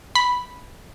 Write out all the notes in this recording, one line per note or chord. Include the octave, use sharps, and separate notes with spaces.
B5